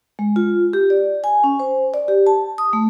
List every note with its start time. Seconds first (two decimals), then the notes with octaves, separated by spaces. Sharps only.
0.19 G#3
0.36 F4
0.73 G4
0.90 D5
1.24 G#5
1.44 C#4
1.59 C5
1.94 D5
2.08 G4
2.27 A5
2.58 D#6
2.73 A3